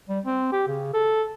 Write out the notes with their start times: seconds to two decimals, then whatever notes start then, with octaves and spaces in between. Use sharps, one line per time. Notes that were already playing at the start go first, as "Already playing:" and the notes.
0.09 G3
0.26 C4
0.52 G4
0.68 C#3
0.94 A4